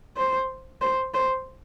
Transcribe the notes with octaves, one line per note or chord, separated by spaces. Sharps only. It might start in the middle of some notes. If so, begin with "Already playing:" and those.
C5
C5
C5